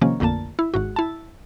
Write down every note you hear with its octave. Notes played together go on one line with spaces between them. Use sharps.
C3 D#3 F3 A#3 C#4
A1 F2 D3 A#3 A5
E4
G#1 G#2 F#4
E4 A5